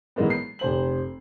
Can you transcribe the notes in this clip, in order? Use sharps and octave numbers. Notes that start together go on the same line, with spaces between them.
E3 F#3 G#3 A#3 B3
C7
F1 C5 F#7